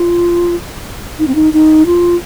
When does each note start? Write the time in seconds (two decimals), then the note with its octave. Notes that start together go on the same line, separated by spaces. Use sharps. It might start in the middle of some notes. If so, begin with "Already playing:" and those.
Already playing: F4
1.19 D#4
1.27 C4
1.35 D#4
1.53 D#4
1.86 F4